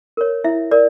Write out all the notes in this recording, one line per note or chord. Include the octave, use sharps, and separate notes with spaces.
A#4 C#5
E4 E5
A#4 D5